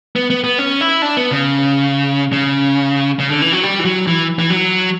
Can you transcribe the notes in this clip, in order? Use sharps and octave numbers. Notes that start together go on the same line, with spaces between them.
B3
B3
B3
C#4
E4
D4
B3
C#3
C#3
C#3
D3
E3
F#3
G3
E3
F#3
E3
E3
F#3